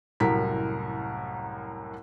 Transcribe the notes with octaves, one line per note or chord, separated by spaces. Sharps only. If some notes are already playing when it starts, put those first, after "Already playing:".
C2 F#2 A2 A#4 B6